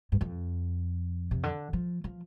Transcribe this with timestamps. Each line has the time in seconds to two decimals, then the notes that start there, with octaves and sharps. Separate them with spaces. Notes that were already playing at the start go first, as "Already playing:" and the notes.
0.12 G2
0.21 F2
1.31 C3
1.43 D3
1.73 F3
2.04 F3